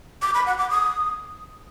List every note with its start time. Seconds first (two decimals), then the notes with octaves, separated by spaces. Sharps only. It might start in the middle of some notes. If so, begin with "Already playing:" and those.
0.22 D6
0.34 B5
0.46 F#5
0.58 D6
0.70 D#6